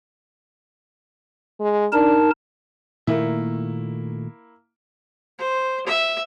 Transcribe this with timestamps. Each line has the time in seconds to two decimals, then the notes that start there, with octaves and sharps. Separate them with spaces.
1.60 G#3
1.93 D4 D#4 A#4 A5
3.07 A#2 D#3 A3 A#3 E4
5.38 C5
5.87 E5